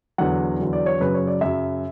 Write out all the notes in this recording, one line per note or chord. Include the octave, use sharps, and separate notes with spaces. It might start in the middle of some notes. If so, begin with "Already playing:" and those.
E2 D3 F#3 F#5
E2 D3 F#3
D5
C#5
F#2 C#3 F#3 B4
C#5
D5
F#2 C#3 F#3 E5